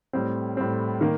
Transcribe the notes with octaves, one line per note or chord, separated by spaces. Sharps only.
A2 G3 C4
A2 G3 C4
D#3 A#3